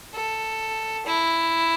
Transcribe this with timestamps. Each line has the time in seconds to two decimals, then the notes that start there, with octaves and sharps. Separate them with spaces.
0.14 A4
1.06 E4